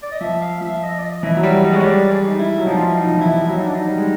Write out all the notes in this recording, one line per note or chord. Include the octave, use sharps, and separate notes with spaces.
D5
D#5
F3 E5
F5
F3 E5
D#5
D5
D#5
E3 E5
F#3
G3 E5
G3 D#5
G#3 C#5
G3 D5
G#4
D#4
E4
F#3
F3 D#4
F4
E4
D#4
F3
E3 E4
F3
F#3 E4
D#4
D4
D#4
G3
G#3